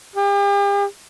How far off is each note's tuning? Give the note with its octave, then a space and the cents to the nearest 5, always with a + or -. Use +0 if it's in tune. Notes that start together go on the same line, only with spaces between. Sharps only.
G4 +40